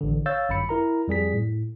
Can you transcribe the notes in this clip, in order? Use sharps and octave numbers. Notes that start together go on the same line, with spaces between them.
A1 D3
C#5 F5 E6 G6 A6
G1 F#2 B5 C#7
E4 A#4 A#5
F2 G3 G#4 B6
A2